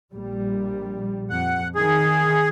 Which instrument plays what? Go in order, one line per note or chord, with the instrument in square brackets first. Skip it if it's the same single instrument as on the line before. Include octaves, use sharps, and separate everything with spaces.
[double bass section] A#1 G3
[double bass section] F2 [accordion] F#5
[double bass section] D#3 [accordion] G#4